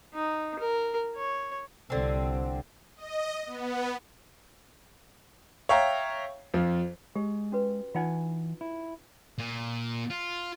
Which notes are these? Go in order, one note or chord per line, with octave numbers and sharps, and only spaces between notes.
D#4
A#4
C#5
C2 D3 C4
D#5
B3
C#5 E5 F5 G5 A#5
F2 F3
G#3 G4
C#4 F#4 B4
E3 D#4 F4 F#5 G#5
E4
A#2
F4